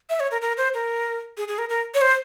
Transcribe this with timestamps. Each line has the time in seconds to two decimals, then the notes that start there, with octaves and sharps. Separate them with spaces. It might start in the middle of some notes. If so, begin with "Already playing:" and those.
0.10 E5
0.20 C#5
0.31 A#4
0.42 A#4
0.57 C5
0.74 A#4
1.37 G#4
1.48 G#4
1.58 A#4
1.69 A#4
1.94 C#5
2.01 C5